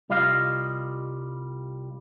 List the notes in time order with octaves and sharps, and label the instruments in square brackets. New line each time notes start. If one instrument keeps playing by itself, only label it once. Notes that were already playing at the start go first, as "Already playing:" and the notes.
[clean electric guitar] C2 G3 F4 D#5 F5